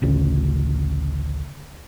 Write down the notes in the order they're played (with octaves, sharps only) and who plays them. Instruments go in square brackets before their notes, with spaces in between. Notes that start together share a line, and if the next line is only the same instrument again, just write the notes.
[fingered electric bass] A1 D2 C#3